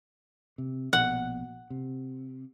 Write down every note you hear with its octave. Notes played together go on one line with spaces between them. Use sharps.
C3
A#1 B2 F#5
C3